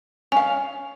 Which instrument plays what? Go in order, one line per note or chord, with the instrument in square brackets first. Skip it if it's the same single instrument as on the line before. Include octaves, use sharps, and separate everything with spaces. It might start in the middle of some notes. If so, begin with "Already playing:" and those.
[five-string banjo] C#4 F5 [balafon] G#5